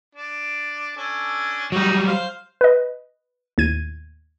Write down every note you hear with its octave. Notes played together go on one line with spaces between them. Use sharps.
D4
C#4 D4 A4
F#3 G3 D#4 F#4
C5 F5
B4 D#5
D#2 A2 G#6 D#7